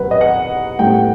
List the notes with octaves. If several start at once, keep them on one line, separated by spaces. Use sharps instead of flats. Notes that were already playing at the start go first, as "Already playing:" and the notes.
Already playing: E2 C3 F#3 B4
D#5
F#5
A2 G3 B3 G5
F#5